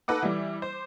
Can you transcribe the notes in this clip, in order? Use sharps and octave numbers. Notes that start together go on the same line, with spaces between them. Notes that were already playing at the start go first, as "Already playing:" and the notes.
D#4 A4 B4 F#5 D6
E3 G3
C5